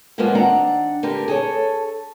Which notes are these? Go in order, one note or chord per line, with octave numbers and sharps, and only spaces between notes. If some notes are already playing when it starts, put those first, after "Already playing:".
A2 D#3 F3 G#3 A#3 B3
D#3 C4 D4 F#5 A#5
D3 G4 A#4 B4
G#4 A4 C#5